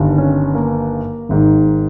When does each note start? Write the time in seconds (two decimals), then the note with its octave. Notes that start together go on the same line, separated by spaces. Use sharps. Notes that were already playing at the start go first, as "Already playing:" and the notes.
Already playing: G1 G2 D#3
0.18 C#4
0.55 A#3
1.29 G#1 G#2 D#3